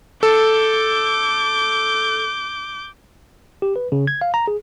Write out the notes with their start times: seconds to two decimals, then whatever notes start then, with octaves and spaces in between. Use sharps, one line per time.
0.23 A4 D6 G6
3.62 G4
3.76 B4
3.92 C#3
4.07 G#6
4.21 F5
4.34 A#5
4.47 G#4